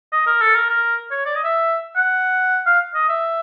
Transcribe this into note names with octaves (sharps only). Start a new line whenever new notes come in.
D#5
A#4
A4
A#4
A#4
C#5
D5
D#5
E5
F#5
F5
D#5
E5